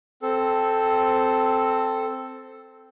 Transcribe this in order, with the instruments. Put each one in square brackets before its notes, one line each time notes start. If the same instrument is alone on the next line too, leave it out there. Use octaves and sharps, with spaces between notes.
[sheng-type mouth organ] C4 A4